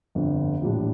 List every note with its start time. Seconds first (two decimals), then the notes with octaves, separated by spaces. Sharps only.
0.15 G1 F2 D3
0.61 A#1 A2 E3 G3 D4